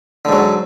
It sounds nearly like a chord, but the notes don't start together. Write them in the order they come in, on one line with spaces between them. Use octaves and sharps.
D3 G#2 F#3